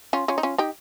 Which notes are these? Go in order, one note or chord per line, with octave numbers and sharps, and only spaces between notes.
C#4 F4
C#4 F4
D#4
C#4 F4
D#4 G4